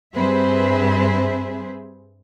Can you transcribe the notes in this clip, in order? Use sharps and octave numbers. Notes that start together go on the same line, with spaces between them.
G2 C4 G#4 B4 C5 E5